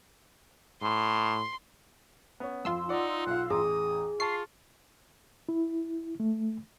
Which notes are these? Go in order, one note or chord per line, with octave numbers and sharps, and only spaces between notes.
A2 C6
B3 C#4
F2 F4 C6 E6
D#4 D5 F#5
B1 F5 F#5
A1 E2 G#4 A#5 D#6
F4 A5 C#6 C7
E4
A3